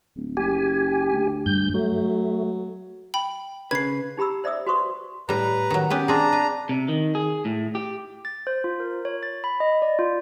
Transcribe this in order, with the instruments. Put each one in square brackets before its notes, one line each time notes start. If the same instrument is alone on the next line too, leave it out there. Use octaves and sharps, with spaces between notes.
[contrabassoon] D1
[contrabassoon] F#1 [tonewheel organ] G4 G#5
[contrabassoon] D2
[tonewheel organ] G2 G6
[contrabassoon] F#3 [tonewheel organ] A3
[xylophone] G5 B5
[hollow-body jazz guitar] C#3 B4 [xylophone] G#6 C7
[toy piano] D#4 G4 A#5 B5 E6
C5 D5 E5 D#6 E6
F#4 B4 C5 C6 C#6 D#6
[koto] A2 G3 [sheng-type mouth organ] B4 A#5
[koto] D#3 F#3
[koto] B3 C#4 B4 [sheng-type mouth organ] G4
[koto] C4 G#4 [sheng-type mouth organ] D4 A#5
[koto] B4
[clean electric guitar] C3
D#3
G#4
A2
G4
[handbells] A6
C5
F4
A#4
C#5
A6
B5
D#5
D5
F4